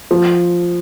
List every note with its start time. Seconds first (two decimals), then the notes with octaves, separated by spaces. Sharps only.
0.11 F3